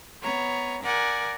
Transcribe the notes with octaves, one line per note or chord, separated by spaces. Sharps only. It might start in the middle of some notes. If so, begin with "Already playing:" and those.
B3 C#5 A#5
A#4 D5 F#5 G#5